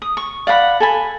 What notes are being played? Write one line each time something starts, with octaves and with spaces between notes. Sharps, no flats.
D#6
C#6
D5 F5 F#5 B5
A4 G#5 B5